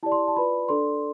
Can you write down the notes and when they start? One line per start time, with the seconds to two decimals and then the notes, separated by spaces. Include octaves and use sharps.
0.03 E4 G4 D5 A5
0.12 C6
0.28 A5
0.37 F4 B4 D5 B5
0.69 D4 A4 D5 C6